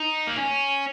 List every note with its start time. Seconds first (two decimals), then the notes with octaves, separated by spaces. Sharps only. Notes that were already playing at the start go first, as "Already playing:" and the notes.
Already playing: D#4
0.27 A#3
0.37 C#4